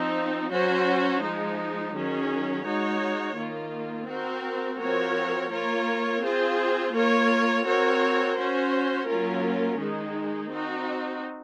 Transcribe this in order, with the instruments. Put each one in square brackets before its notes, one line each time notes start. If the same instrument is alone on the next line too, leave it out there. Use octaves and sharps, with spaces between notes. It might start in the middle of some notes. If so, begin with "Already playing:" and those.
Already playing: [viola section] F3 C4 D#4
F#3 C#4 F#4 C5
F3 G#3 D#4
D#3 F#3 C#4 G#4
G#3 D#4 F#4 C#5
D#3 A#3 F4
C4 F#4 A#4
F3 C4 F#4 A#4 C#5
A#3 F4 A#4 C#5
C4 F4 G#4 C5
A#3 F4 A#4 C#5
C4 F#4 A#4 C#5
C#4 F#4 C5
F#3 A#3 C#4 F4 A#4
D#3 G#3 D#4 G#4
C4 D#4 F#4